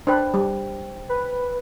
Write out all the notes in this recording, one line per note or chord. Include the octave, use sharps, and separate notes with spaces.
D4 B4 C5 G5
G3
B4